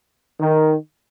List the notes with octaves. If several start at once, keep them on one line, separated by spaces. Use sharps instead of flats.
D#3